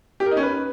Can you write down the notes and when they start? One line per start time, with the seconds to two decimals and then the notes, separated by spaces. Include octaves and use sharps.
0.20 G4
0.26 A#4
0.31 D#4
0.37 C#4
0.43 B4